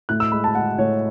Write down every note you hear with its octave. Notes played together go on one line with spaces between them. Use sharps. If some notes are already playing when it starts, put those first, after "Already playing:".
A2 F#6
E6
G#3 B5
A5
G#3 F#5
A2 C#5